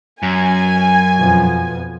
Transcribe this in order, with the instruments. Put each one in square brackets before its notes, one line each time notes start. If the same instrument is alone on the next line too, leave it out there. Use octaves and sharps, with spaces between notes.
[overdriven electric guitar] F#2 [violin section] G#5
[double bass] F2 B2